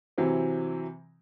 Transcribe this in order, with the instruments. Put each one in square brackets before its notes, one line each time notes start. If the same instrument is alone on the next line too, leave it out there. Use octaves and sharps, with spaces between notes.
[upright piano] C3 E3 F#3 C4